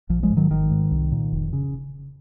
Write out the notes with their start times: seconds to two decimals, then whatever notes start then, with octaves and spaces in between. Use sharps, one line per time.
0.09 A#1 F3
0.23 F3 G#3
0.30 G#2
0.37 D#3 F#3
0.50 G#1 D#3
0.71 G#2
0.91 C2
1.12 A#2
1.32 F1
1.53 C#3